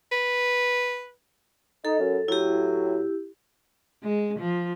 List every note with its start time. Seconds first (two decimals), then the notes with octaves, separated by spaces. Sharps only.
0.12 B4
1.85 D#4 A4
1.99 F#2
2.28 A2 F#3 E4 G4
4.03 G#3
4.39 F3